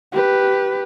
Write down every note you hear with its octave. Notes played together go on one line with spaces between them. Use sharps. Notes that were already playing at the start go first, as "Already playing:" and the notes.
G4 B4